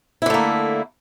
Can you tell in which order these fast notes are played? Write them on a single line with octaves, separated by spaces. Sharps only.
E4 D3 A3 A#3